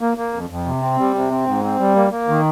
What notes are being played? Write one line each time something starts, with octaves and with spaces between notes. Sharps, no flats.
A#3
A#3
F2
F2
C3
C4
G3
C3
C4
G#2
C4
G3
A#3
A#3
D#3